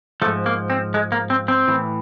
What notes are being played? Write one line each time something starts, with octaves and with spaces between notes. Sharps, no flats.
G#2 F3 A3
A#3
C4
G#3
A#3
C4
C4
A2 E3